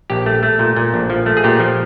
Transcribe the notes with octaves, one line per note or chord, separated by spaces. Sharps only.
A#1 G4
A3
A3
A#2
A#2
A#1
F3
A3
G#4
A#2 G4
F3